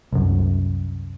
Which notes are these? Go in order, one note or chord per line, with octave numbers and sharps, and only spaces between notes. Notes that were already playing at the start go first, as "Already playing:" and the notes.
C2 F#2